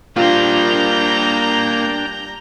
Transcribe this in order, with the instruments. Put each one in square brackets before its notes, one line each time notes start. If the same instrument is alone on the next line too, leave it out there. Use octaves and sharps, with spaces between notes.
[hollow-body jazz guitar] G3 F4 [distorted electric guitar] A#3 C5 [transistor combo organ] D4 G5 [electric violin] A#5 G6